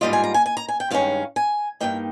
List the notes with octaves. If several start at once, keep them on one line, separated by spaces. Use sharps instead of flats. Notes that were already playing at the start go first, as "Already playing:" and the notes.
G#2 G3 A#3 F4 D#5
G#5
A#5
G#5
G#5
A#5
G#5
G5
G2 D#3 G#3 C#4 F5
G#5
G2 D#3 A#3 D#4 G5